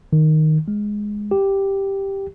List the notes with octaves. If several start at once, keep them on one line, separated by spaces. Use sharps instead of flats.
D#3
G#3
G4